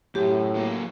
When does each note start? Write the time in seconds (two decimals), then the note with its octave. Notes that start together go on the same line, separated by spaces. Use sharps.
0.15 F#2 A2 G4
0.55 F#3 A#3